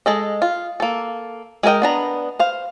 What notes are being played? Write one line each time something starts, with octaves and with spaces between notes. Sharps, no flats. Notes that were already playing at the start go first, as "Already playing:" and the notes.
G#3 A4 D#5
F4
A#3 A4
G#3 G#4 A#4 D#5 G5
B3 D4 A#5
C5 F5